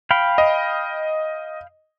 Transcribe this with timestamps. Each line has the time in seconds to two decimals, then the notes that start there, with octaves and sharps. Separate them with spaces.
0.11 F5 G5 B5
0.38 D#5